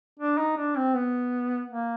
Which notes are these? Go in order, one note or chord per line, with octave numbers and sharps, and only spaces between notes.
D4
D#4
D4
C4
B3
A#3